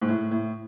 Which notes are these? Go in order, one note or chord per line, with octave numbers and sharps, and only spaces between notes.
G#2
A2
A2